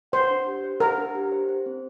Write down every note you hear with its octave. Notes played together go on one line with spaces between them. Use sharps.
C5 F#5
D4
G4
C5
A#4 F#5
D4
G4
C5
C5
C4